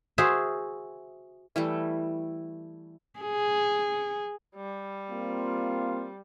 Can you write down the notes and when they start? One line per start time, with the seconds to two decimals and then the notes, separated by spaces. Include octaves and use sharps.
0.18 F#4 G#4 C5 E5
1.56 E3 G3 A3
3.20 G#4
4.56 G3
5.09 A#3 C4 F4